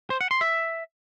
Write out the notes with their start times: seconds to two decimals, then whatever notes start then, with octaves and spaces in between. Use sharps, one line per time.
0.10 C5
0.21 F#5
0.31 C6
0.41 E5